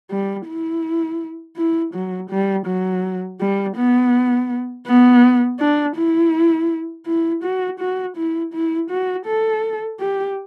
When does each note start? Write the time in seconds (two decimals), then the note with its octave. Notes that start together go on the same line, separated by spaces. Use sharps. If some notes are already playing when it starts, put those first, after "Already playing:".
0.11 G3
0.47 E4
1.57 E4
1.94 F#3
2.30 G3
2.66 F#3
3.40 G3
3.77 B3
4.87 B3
5.60 D4
5.96 E4
7.06 E4
7.44 F#4
7.80 F#4
8.17 E4
8.54 E4
8.90 F#4
9.26 A4
10.00 G4